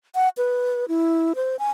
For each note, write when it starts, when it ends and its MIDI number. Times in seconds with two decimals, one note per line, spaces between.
0.16 0.29 78
0.38 0.85 71
0.88 1.33 64
1.35 1.56 72
1.59 1.70 80